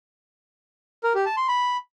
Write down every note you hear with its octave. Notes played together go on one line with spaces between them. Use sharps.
A#4
G4
A5
C6
B5